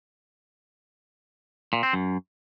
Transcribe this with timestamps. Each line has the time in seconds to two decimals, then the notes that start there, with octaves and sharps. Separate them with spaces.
1.73 A#2
1.83 C4
1.93 F#2